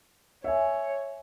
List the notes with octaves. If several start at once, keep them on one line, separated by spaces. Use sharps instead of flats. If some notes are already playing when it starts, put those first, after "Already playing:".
C#5 E5 G#5